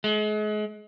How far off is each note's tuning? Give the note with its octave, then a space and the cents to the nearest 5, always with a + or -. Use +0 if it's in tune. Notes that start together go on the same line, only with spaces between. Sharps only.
G#3 +35